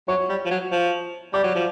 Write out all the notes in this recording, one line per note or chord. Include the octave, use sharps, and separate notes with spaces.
F#3 C#5 C#6
G3
F3
F#3
F3
G3 D5 D6
F#3
F3